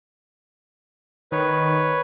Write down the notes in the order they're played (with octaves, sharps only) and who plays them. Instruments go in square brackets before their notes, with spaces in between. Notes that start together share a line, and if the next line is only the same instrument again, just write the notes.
[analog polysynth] D#3 [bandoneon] B4 C#5